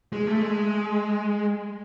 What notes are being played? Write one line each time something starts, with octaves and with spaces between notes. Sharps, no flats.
G#3
A3
G#3